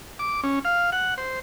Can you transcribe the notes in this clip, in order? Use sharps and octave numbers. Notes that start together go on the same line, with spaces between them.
D6
C#4
F5
F#5
C5